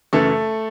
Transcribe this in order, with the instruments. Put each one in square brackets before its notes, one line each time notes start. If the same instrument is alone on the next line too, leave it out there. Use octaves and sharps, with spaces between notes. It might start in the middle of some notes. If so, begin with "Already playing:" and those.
[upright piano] F#2 C#3 E3 A3 A4